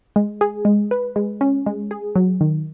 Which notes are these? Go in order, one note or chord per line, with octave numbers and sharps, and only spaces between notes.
G#3
G#4
G#3
B4
G#3
C#4
G#3
G#4
F#3
D#3